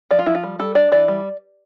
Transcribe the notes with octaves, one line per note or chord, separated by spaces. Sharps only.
F3 D5
F4
F3 E4
F4
G3
G3 A4
D4 D5
E3 D5
G3